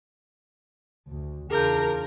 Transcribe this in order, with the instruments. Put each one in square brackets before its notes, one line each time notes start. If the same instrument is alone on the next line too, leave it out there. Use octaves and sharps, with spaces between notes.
[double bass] D2
[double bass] E2 C#3 [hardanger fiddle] D4 F4 [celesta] G#4 G6 [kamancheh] A#4